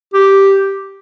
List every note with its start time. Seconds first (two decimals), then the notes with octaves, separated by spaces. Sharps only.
0.14 G4